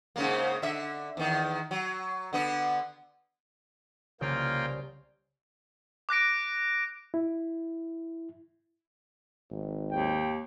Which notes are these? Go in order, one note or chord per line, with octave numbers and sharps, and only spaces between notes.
G#2 C#3 A#3
D3 E5
E2 D#3
F#3
D3 B3
C2 C#3 A#3 F4 C#5 G5
D6 F#6 A#6 D7
E4
G#1
D#2 G5